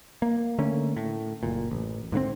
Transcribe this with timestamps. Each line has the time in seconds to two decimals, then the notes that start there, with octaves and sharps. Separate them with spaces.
0.22 A#3
0.58 D3 A3 A#3 C#4
0.96 A2
1.43 F#1 A#2
1.71 A1
2.12 G#2 D3 D#3 C4